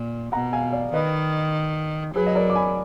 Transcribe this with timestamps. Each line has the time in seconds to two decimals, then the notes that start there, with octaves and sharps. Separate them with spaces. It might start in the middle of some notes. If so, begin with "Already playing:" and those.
Already playing: A#2
0.32 B2 F#5 A#5
0.53 F5 G#5
0.73 D5 F5
0.93 D#3 B4 D#5
2.15 F#3 G#4 B4
2.27 D#5
2.35 A#4 D5
2.50 D6
2.55 G#5 B5